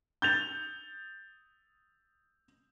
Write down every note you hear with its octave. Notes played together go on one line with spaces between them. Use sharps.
G6 A6 F7